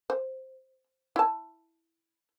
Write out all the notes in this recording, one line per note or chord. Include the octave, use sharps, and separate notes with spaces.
C5
E4 A5